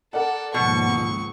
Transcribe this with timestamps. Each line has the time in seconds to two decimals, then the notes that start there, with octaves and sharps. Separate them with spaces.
0.13 A4 A#4 D5 F#5
0.54 D#2 G#2 B2 F3 C#6
0.89 C#2